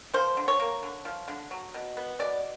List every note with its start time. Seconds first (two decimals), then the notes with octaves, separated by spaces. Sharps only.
0.14 F3 C5
0.37 D3
0.48 C#5
0.60 A#3
0.83 D3
1.05 F3
1.28 D3
1.51 F#3
1.74 B2
1.97 B3
2.19 B2 D5